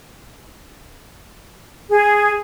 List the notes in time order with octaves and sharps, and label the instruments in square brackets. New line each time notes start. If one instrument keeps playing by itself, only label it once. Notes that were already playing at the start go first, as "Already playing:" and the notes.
[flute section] G#4